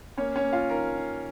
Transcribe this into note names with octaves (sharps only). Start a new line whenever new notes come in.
A#3 C#4 C#5
C#4 C#5
A#3
F4 F5
D#3 A#4 A#5
D#3